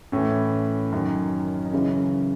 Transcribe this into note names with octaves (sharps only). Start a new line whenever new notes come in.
A2 E3 C#4
F#2 D#3
D#4
F#2 C#3 E3 C#4